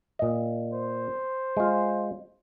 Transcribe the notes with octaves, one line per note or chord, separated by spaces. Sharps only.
A#2 D#5
C5
G#3 F4